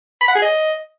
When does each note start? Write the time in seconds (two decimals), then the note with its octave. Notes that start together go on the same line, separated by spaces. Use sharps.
0.21 B5
0.28 F#5
0.35 G#4
0.42 D#5